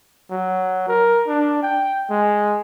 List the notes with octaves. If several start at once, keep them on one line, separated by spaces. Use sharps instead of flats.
F#3
A#4
D4
G5
G#3